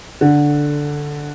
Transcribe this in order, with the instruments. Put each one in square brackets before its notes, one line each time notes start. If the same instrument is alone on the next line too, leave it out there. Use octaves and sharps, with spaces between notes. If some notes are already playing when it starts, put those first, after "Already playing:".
[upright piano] D3